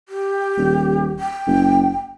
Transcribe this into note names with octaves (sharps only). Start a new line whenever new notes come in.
G4
D#1
G5
F#1